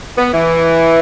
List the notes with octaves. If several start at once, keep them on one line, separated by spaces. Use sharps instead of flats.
B3
E3